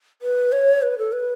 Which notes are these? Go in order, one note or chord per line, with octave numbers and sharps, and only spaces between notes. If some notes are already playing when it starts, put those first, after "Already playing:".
B4
C#5
B4
A4
B4